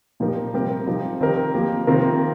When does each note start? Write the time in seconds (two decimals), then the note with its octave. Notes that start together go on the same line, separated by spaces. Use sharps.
0.20 A#2 F3 D#4 G4 A#4
0.53 C3 G3 C4 G4 A#4
0.87 C3 F3 D#4 G4
1.21 D#3 C4 D#4 G4 A#4
1.54 F3 A#3 G4
1.87 C3 D#3 C4 F4 A#4